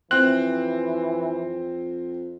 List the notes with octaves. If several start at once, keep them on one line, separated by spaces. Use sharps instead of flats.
F2 E3 C4 F#6